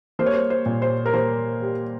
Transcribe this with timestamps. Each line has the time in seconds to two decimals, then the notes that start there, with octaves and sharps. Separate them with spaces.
0.19 A#3 C5
0.26 C#5
0.33 C5
0.50 C5
0.66 A#2
0.82 C5
1.06 A#4
1.13 A#3 C5
1.61 G3